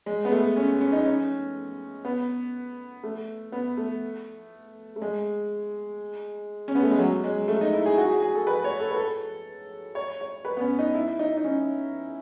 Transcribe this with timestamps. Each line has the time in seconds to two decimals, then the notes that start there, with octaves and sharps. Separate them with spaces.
0.06 G#3
0.25 B3
0.32 A3
0.56 C#4
0.81 C#4
0.92 D#4
1.05 C#4
2.05 B3
3.04 A3
3.52 B3
3.77 A3
4.96 A3
5.02 G#3
6.68 C#4
6.75 B3
6.83 A3
6.91 G#3
6.99 F#3
7.24 G#3
7.48 A3
7.61 D#4
7.73 E4
7.86 G#4
7.98 F#4
8.10 G#4
8.22 G#4
8.35 A4
8.47 B4
8.64 C#5
8.80 A4
8.91 B4
8.96 A4
9.95 C#5
10.21 C#5
10.45 B4
10.57 B3
10.61 C#4
10.79 D#4
10.95 E4
11.19 D#4
11.37 D#4
11.44 C#4